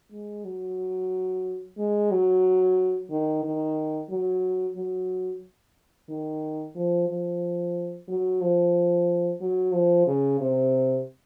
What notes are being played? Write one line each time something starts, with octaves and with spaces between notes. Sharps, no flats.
G#3
F#3
G#3
F#3
D#3
D#3
F#3
F#3
D#3
F3
F3
F#3
F3
F#3
F3
C#3
C3